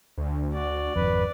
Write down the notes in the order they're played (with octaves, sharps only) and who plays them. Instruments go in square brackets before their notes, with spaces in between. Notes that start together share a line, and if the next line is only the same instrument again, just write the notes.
[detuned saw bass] D2
[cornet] F#4 [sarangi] D5
[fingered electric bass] G#1 F2 [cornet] B4